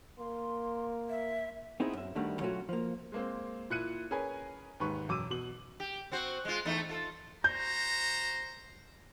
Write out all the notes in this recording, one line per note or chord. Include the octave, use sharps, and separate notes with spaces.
A#3 C6
E5
B3 C4 D#4 E4 G#4
F#2 E5
D2 D3 D#3 G3 A3
F#3 A3 C#4 F4 F#4
F3 A#3
G#3 A#3 C4
A#2 E4 F#6 C#7 D#7
C#4 G#4 A#4 B4 G#5
D#2 G#2 B4 C#6
E1 F#2 D6 E6 D#7
B2 F#7
G4
C4 F#4 C5
G#3 F4
E2 A3 D#4
F4 A4
F#4 C5 A#5 G6